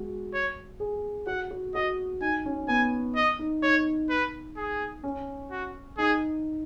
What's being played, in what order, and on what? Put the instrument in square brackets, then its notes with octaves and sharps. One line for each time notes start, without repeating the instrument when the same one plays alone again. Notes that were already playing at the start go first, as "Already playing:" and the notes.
Already playing: [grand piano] G#3 F#4
[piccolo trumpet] C#5
[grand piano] G#4
[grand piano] F#4 [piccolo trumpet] F#5
[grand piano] F#4
[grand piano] F#4 [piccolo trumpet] D#5
[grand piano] D#4 [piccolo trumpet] G#5
[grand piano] C#4
[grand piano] B3 [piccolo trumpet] G#5
[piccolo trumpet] D#5
[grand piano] D#4
[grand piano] D#4 [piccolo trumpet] C#5
[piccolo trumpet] B4
G#4
[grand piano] C#4
[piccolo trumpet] F#4
[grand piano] D#4 [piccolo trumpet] G#4